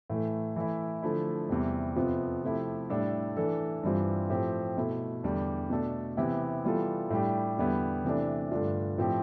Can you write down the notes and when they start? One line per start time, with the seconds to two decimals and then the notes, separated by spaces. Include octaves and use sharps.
0.10 A2 E3 A3
0.56 E3 A3 E4
1.02 D3 F3 A3 E4
1.49 E2 C3 G3
1.96 F2 C3 F3 B3 F4
2.43 C3 F3 A3 E4 G4
2.90 A2 G3 D4 A4
3.37 E3 A3 D4 A4
3.83 G2 E3 G3 C4 F4
4.30 A2 F3 C4 G4
4.77 B2 A3 E4
5.23 E2 D3 G3 D4
5.70 B2 A3 D4 A4
6.17 C3 E3 B3 E4 G4
6.65 E3 G3 B3 F4 A4
7.10 A2 G3 D4 G4
7.58 E2 D3 G3 B3 E4
8.05 C3 E3 A3 D4
8.51 G2 D3 A3 D4 F4
8.98 A2 F3 C4 G4